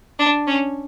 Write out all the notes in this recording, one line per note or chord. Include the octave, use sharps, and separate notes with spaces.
D4
C#4